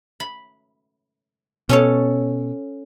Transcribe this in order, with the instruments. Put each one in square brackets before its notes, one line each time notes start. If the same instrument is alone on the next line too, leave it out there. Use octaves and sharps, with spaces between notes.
[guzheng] B5
[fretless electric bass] B2 [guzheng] C#4 A4 C#5